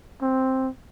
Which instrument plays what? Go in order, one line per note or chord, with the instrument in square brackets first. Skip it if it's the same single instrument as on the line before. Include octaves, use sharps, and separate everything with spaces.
[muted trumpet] C4